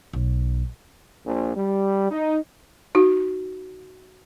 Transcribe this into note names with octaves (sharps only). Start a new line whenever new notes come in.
B1
A#1
G3
D#4
D#4 F#4